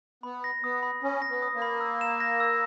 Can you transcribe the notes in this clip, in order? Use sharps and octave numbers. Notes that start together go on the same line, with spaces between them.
B3 B5
A#6
B3 D#6
B5
C#4 B5
A#6
B3
D#6
A#3
B5
E6
E7
A#6
E6